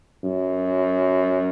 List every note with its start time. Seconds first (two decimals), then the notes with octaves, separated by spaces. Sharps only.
0.23 F#2